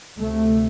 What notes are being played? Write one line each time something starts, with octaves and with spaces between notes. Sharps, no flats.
D2 C3 A3